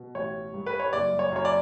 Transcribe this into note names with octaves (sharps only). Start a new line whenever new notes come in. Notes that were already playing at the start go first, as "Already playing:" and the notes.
Already playing: B2
A1 C#5
G2
B4
C#5
F#1 D5
C#5
F#2 C#5
D5